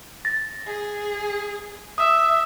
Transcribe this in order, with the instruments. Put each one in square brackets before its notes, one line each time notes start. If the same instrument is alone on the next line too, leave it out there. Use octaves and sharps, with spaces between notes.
[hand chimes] A6 A#6
[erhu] G#4
[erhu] E5 [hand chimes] D#6 E6